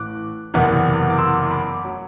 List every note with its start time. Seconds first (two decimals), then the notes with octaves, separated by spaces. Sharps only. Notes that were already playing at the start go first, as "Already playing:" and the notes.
Already playing: A1 A2 D6 F#6
0.54 F#1 E2 C3 E3 B3
1.10 D6
1.18 C6 E6
1.43 C6
1.51 B5 D6
1.84 F#3